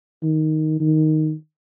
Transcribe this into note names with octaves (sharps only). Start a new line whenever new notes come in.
D#3
D#3